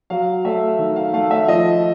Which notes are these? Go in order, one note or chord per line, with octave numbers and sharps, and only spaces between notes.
F#3 F5
A3 E5
D#3
F5
A3 F5
E5
F3 D#5